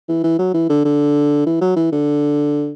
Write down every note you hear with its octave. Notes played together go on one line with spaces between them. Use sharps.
E3
E3
F#3
E3
D3
D3
E3
F#3
E3
D3